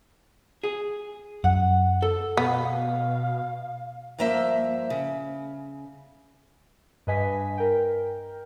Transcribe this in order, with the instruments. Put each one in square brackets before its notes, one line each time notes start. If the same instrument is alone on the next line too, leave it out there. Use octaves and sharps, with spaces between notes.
[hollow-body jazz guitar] G#4
[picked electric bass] F#2 [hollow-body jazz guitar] F#5
[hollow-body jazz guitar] A4
[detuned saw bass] B2 [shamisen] B3 [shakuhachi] F5
[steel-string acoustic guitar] G2 F3 A#3 C5 E5
C#3
[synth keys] G2 B4 D#5 G#5 B6
A#4 G5